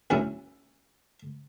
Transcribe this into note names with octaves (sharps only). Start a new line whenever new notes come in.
A#1 F#2 C#4 E4